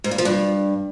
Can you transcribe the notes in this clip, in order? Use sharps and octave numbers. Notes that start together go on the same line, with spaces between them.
G#2
G2
F3
G2